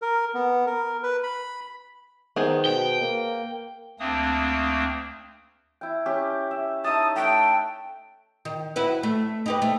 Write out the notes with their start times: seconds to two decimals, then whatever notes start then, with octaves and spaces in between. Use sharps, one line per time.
0.02 A#4
0.34 B3
0.66 A#4
1.03 B4
1.23 B5
2.36 D#3 B3 G#4 C5
2.65 B2 G5
3.00 A#3
4.00 D2 A3 A#3 C4 D4 D#6
5.81 E4 G5
6.06 C#4 G4
6.51 E5
6.84 D#4 E5 A5 D#6
7.16 A3 F#5 G5
8.45 D#3
8.76 E4 F#4 B4
9.03 A3
9.46 D#4 G4 B4
9.62 A3